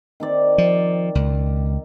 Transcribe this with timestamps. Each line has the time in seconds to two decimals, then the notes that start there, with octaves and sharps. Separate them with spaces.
0.20 D#3 C4 D5
0.58 F3
1.15 C#2